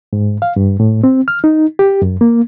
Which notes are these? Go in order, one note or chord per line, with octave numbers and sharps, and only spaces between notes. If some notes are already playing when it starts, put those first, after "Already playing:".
G#2
F5
G2
A2
C4
F6
D#4
G4
F#2
A#3